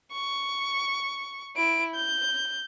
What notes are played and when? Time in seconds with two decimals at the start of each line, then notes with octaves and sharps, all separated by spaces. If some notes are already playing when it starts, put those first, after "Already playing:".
0.12 C#6
1.56 E4 D7
1.95 G6